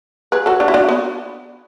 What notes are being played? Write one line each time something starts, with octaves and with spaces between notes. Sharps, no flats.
G#4 B4
F#4 A4
D4 F#4
E4
D4 F#4
B3